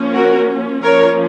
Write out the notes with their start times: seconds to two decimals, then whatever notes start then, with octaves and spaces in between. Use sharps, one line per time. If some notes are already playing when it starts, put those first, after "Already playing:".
Already playing: F3 A#3 C#4
0.14 F#4 A#4
0.82 F3 A#3 C#4 A#4 C#5